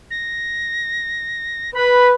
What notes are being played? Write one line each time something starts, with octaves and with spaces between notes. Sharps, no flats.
A#6
B4 B5